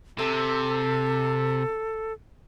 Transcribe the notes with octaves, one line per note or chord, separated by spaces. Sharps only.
C3 A4